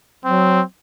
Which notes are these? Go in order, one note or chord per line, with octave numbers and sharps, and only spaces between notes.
F#3 C4